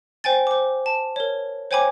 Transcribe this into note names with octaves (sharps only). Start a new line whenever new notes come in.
C5 G5 G#5 A6
C5 D6
A5
A#4 C#5
C5 C#5 G5 G#5 B5 D6